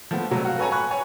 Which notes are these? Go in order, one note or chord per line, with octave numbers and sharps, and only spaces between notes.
F3 A3 B3
C3 F#3 G3 A3
F#4 F5
A4 B4 C#5 G#5 A#5
G#5 B5 C#6 F#6
C#5 G#5